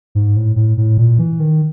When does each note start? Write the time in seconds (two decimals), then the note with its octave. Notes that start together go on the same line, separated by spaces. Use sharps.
0.15 G#2
0.36 A2
0.56 A2
0.77 A2
0.98 A#2
1.19 E3
1.40 D#3